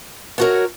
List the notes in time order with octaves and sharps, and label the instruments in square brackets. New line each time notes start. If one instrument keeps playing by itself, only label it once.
[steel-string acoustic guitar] B3 F#4 A#4 C#5